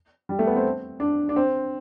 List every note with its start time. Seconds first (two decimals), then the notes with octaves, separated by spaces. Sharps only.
0.29 G3
0.39 A3
0.47 B3
0.56 C4
1.00 D4
1.29 D4
1.36 C4